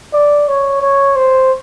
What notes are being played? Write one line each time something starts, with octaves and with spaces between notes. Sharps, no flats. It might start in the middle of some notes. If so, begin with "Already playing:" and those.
D5
C#5
C#5
C5